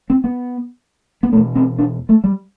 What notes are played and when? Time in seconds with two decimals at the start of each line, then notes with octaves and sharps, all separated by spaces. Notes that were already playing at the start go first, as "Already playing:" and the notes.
0.10 C4
0.24 B3
1.23 B3
1.32 B2 A3
1.36 E2
1.55 C4
1.78 D4
2.09 A3
2.24 G3